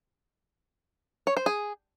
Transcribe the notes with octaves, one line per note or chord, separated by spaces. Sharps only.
C#5
C5
G#4